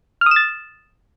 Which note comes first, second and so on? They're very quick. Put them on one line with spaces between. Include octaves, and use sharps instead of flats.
F6 D#6 E7 A6